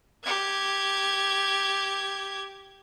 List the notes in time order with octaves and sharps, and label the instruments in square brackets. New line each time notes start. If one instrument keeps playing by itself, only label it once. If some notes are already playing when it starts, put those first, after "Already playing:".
[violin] G4 G#6